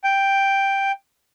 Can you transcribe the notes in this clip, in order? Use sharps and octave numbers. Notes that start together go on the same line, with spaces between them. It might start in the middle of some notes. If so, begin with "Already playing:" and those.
G5